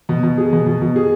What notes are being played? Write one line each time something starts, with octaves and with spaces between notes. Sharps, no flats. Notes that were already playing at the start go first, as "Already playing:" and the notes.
B2
B2
G#4
B2
B2
B2
G#4